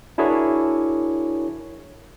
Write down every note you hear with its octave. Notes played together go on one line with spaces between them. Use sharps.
D4 E4 F#4 G#4 A#4 C#5